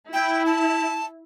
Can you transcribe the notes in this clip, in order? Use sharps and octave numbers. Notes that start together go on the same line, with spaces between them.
E4 G5
A5